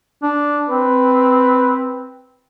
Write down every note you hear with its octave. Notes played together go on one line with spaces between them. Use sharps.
D4
C4 B4